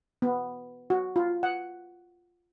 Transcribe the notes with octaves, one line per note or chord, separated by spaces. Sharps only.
B3
F#4
F4
F#5